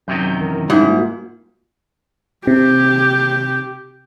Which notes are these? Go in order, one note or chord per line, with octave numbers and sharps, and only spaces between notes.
F#2 C3 D#3 F#3 G6
E3 A#4
G#2 G3 C#4 E4 G4
A#3 F4 F#4
C3 G4